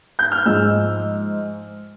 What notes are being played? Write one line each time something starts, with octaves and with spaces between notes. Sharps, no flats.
G6
F6
G#2 F3 G#3 E6